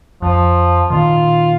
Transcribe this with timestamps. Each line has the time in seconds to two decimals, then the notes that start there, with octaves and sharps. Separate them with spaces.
0.22 F2 F3
0.90 A#2 D#3 F4